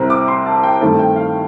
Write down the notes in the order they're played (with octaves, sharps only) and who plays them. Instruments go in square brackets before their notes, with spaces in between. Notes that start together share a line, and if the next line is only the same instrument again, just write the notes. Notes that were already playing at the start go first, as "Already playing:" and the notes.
Already playing: [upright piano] C2 C3 G3 C4 A#5
D6
C6
A5
G5
G2 D#3 A3 C4 A5
G5
F5